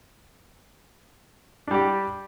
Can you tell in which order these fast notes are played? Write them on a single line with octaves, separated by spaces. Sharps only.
D4 G3 G4